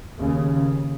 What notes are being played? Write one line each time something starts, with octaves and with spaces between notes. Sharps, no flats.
D#2 C#3